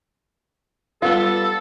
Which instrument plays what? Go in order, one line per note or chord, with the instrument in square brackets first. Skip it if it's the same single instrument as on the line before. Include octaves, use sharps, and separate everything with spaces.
[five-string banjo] G3 B3 F4 [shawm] A4